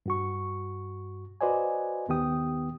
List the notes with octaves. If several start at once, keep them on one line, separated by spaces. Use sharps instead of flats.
G2 F#4 C#6
F#4 B4 C5 D5 D#5 G#5
D#2 D#3 B3 G4 G5 D#6